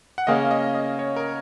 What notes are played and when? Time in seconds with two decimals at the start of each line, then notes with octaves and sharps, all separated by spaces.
0.18 F#5
0.27 C#3 A#3 C#4 G#4 D#5
0.51 D#5
0.75 D#5
0.99 C#5
1.16 A#4